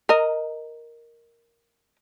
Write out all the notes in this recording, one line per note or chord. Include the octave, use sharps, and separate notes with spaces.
A#4 D#5